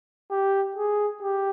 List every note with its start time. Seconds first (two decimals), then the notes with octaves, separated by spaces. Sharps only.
0.31 G4
0.77 G#4
1.22 G4